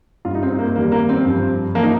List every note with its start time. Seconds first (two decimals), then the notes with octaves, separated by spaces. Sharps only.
0.25 G2 G3 F4
0.35 D#4
0.43 C4
0.59 A#3
0.76 F2 D#3 G3 A#3
0.92 A#3
1.09 C4
1.25 G2 F3
1.75 F3 A#3
1.83 D#4